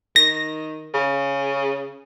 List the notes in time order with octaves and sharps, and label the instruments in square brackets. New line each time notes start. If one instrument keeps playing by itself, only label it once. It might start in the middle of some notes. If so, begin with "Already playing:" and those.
[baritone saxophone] D#3 [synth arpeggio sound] A#6
[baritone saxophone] C#3